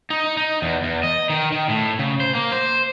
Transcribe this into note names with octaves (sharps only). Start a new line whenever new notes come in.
D#4
D#4
E2
E2
D#5
D#3
D#3
A2
C#3
C5
A#3
C5